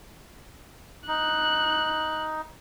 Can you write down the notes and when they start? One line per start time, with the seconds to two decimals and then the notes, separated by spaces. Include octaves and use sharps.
1.08 D#4 F#6